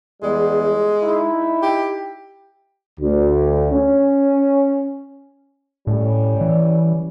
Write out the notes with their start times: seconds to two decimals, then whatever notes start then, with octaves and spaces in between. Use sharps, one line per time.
0.23 E2 G3 G#3
1.02 D#4 E4
1.62 G4
3.00 D2
3.72 C#4
5.87 A2 G3 C#4
6.41 E3